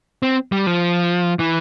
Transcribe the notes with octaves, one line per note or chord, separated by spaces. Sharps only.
C4
G3
F3
E3